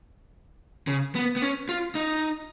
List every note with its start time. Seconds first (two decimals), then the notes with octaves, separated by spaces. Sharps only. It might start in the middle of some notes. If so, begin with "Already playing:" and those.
0.87 C#3
1.15 B3
1.36 B3
1.42 C#4
1.69 F4
1.95 D#4